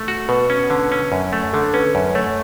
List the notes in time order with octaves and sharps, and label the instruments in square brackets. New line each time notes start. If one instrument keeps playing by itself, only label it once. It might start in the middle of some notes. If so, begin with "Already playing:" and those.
Already playing: [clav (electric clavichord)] A3
F#4
[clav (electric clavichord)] B2 [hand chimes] B4
[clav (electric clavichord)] C#4
D3
C#4
F#2
A3
[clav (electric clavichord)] D3 [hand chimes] A4
[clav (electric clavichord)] C#4 [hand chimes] B4
[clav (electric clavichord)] F#2 [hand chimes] C#5
[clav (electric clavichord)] A3 [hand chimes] C#5